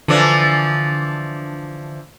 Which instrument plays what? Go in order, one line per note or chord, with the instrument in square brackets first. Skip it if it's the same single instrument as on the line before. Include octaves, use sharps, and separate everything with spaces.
[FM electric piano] D3 [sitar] E3 F3 D4